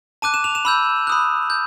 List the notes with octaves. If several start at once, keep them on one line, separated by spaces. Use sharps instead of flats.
A5 D6 F#6 D#7
E7
F7
E7
B5 E6 G6
B5 D#6 F#6
G6